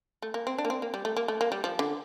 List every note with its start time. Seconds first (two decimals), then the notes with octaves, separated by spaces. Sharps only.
0.22 A3
0.34 A#3
0.47 C4
0.58 D4
0.65 A#3
0.70 C4
0.82 A#3
0.94 G3
1.05 A3
1.17 A#3
1.28 A3
1.41 A#3
1.52 G3
1.64 F3
1.79 D3